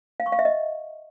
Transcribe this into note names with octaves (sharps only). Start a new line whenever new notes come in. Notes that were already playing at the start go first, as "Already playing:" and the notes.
F5
C#6
F5
E5
D#5